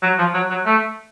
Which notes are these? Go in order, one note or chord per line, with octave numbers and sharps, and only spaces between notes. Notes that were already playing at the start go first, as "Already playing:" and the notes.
F#3
F3
F#3
F#3
A3